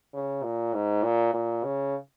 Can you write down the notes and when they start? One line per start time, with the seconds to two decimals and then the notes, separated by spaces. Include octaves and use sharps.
0.14 C#3
0.43 A#2
0.74 G#2
1.03 A#2
1.33 A#2
1.64 C#3